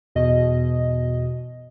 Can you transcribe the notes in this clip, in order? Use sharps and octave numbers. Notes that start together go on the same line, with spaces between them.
E2 B2 D#5